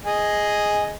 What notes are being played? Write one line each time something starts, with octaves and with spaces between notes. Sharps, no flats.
G#4 D#5